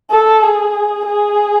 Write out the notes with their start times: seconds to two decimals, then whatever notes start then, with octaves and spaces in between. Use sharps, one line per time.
0.10 A4
0.42 G#4
1.05 G#4